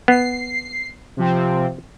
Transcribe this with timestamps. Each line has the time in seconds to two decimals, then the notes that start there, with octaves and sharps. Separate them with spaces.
0.08 B3 C7
1.17 C3 F3 C4